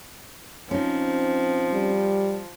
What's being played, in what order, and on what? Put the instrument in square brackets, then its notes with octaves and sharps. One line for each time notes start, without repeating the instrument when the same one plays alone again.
[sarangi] F3 [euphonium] C4 [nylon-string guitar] C#4 D#4
[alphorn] G3